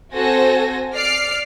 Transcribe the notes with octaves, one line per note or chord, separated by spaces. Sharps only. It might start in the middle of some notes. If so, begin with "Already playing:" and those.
C4 F#4 A4 C5 G#5 A#6
D5 F6 C7 D7